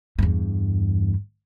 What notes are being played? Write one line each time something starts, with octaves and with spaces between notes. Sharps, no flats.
E2 G2